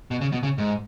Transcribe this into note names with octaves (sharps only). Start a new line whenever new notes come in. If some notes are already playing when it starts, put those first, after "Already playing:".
B2
C#3
B2
C#3
G#2